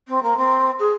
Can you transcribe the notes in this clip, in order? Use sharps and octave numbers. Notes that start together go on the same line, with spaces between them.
C4
A#3
C4
G#4